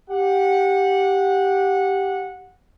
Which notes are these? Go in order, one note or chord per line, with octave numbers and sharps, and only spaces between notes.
G4 F#5